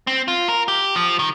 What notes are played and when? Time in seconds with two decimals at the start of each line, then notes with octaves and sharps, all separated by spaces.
0.07 C4
0.28 F4
0.48 A#4
0.68 G4
0.96 F3
1.19 D#3